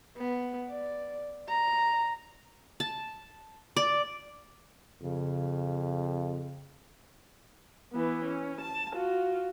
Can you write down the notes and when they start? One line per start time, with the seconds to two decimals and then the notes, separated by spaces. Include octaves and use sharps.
0.18 B3
0.70 D5
1.49 A#5
2.80 A5
3.76 D5
5.03 F2 C#3
7.92 E3 B3
8.24 C#4
8.61 A5
8.92 F4 F#4